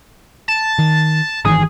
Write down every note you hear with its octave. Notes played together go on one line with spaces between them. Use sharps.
A5
D#3
G#1 D#3 E3 G#4